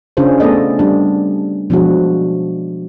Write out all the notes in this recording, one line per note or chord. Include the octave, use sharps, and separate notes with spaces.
C#3 C#4 D4 F4 G#4 C5
A3 B3 A4 D5 D#5
G3 D4
B2 F3 F#3 G#3 D4 F#4